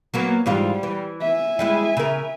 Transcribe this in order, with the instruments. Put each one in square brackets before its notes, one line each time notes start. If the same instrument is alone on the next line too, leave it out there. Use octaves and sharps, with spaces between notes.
[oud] F#3 A#3 B3
[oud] G#2 E3 F4 [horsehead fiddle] G3
[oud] E3
[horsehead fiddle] E5 G#5
[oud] G3 G#3 E4
C#3 A#4